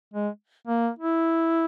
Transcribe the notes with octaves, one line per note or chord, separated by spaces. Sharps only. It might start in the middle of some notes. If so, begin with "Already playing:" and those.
G#3
A#3
E4